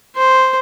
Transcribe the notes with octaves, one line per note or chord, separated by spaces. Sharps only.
C5